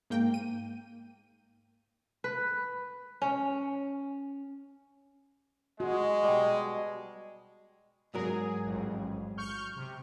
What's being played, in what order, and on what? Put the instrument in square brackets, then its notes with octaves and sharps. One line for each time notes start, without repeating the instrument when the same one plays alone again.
[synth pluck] G#2 A#3 G5
D#7
[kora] B4
C#4
[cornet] G#3 [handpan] F#4 [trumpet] D#5
[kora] B2 G3
[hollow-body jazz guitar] G#2 F#3 A#4 [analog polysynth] G#4
[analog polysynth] A1 F2
C#6 F6 G6
C3